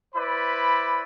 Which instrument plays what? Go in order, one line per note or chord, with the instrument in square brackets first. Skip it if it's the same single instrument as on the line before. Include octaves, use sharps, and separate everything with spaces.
[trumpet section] E4 B4 C5 D5 B5